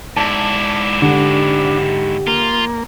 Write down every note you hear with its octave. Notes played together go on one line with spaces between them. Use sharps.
G#2 E4 D5 A5
D3 D4 G4
A#3 F4